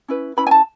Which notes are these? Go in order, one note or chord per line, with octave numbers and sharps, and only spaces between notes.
C#4 E4 B4
C#4 E4 B4 B5
G#5
A5